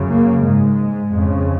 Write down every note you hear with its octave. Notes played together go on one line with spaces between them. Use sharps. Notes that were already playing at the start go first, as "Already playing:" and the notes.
Already playing: F#2 C#3
A#3
G#2 G#3
F2 C#3